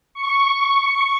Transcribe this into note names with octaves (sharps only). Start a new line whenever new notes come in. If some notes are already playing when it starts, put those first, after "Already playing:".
C#6